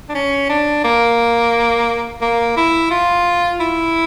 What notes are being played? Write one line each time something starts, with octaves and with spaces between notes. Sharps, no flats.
D4
C#4
D4
A#3
A#3
E4
F4
E4